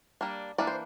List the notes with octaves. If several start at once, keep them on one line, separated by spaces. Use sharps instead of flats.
G3 A#3 D4
E3 A#3 D4 D5
C5